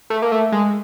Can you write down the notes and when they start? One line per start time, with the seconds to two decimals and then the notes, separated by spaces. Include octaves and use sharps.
0.10 A3
0.22 A#3
0.32 A3
0.52 G#3